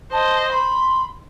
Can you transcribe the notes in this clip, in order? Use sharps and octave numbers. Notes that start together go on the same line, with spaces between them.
C5 D#5 A5
B5 C6